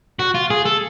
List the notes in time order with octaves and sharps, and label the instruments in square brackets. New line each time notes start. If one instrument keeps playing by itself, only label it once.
[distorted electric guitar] F#4
F4
G#4
A4